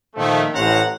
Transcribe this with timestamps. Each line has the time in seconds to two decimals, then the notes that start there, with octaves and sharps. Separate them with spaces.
0.15 A#2 D#3 F3 A3
0.53 A1 A2 C#4 C5 F#5 A#5